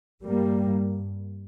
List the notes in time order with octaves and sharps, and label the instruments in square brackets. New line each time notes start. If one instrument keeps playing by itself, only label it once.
[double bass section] G2 G3 A#3